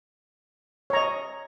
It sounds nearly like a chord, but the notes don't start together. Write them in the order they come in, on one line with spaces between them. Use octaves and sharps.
C#5 A#5 D#5